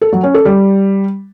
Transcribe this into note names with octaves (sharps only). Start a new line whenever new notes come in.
A4
F#3
C#4
A4
G3